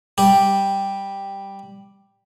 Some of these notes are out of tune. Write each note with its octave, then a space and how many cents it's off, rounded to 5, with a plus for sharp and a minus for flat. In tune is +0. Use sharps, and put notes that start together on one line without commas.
G3 +0 G4 +0